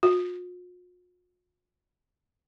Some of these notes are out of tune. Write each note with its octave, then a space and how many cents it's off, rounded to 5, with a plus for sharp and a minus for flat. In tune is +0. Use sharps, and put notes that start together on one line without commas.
F4 +45